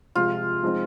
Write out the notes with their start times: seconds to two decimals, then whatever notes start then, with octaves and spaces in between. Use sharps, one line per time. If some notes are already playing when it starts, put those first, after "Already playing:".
0.15 C3 F3 G#3 F4
0.63 F3 G#3 C4 D#4